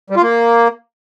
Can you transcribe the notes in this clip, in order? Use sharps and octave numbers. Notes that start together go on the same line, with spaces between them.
G3
F4
A#3